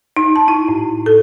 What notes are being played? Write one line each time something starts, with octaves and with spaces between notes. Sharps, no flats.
D#4
A5
E4
A2
A4